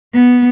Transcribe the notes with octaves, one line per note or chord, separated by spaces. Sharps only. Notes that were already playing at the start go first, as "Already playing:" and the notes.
B3